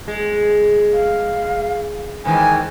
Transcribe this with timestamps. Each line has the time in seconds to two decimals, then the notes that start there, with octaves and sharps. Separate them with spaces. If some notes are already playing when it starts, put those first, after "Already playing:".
0.08 G#3
0.93 F5
2.25 G#2 D#3 E3 G#5